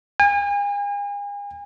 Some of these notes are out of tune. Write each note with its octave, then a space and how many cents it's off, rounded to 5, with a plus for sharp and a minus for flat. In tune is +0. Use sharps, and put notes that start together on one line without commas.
G#5 -40